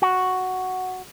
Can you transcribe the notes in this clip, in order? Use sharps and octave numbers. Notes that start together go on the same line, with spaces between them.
F#4